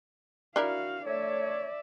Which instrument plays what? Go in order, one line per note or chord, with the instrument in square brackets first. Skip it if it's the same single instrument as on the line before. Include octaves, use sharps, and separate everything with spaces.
[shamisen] D4 E4 A#4 [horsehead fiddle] F#4 F5
[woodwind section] A3 C#5 [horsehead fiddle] D5 E5